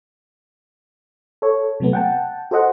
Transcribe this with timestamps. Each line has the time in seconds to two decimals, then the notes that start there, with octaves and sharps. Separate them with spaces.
1.42 A4 C#5
1.80 C3 F#3 A3 B3
1.93 F#5 G5 A5
2.51 F#4 A4 C5 D#5 F#5